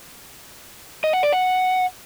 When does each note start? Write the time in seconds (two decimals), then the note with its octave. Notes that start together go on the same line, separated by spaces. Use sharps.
1.04 D#5
1.13 F#5
1.23 D5
1.33 F#5